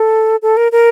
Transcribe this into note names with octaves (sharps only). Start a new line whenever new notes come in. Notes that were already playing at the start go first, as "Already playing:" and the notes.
Already playing: A4
A4
A#4
A#4